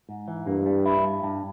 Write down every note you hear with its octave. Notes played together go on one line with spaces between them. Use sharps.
G#2
E3
G2 A#3
G3
E4
G2
G2